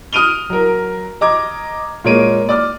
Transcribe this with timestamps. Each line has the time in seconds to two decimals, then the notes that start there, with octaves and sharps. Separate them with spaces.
0.13 D#6 F6 D7 D#7 F7 G7
0.50 F#3 A#4
1.21 D#5 A#5 D6 G#6
2.04 A#2 G#3 A#3 C#5 D7 D#7
2.49 D5 D6 F6